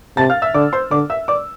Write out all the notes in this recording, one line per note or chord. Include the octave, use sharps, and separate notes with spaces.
C3 A5 A6
F5 F6
E5 E6
D3 D5 D6
C5 C6
D3 D5 D6
E5 E6
D5 D6